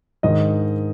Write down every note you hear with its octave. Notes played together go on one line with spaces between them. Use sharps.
G#2 D#3 D#5